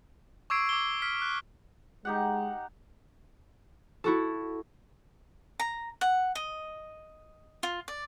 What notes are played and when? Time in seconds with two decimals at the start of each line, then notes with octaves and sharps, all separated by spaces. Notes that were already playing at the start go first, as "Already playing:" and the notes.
0.50 C#6 D6 E6 G#6 C7 D7
0.69 D6 G7
1.02 F6 B6
1.22 F#6
2.05 G#3 D#4 G4 F#5
4.04 E4 F#4 A4
5.59 A#5
6.01 F#5
6.35 D#5
7.63 F4
7.88 D5